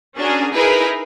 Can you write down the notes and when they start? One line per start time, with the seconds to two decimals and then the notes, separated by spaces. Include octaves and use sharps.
0.17 C#4 D4 F#4 G#4 A#4
0.52 D#4 E4 G#4 A#4 B4